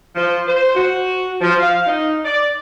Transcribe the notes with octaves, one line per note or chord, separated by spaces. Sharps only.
F3
C5
F#4
F3
F5
D#4
D5